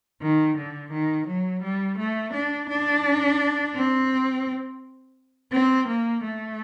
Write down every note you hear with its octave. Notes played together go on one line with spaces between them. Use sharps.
D#3
D3
D#3
F#3
G3
A3
D4
D4
C4
C4
A#3
A3